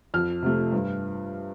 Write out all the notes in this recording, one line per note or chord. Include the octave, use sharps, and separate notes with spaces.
F2 F6
C3 F3 A3
G2